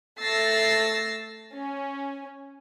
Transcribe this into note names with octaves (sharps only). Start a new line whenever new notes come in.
A3 E6 A6 A#6 C7
C#4